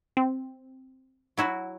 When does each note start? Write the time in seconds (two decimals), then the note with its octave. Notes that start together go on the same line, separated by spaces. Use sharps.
0.17 C4
1.37 F#3 E4 F#4